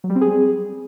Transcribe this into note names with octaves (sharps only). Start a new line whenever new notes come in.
F#3
G3
C4
G#4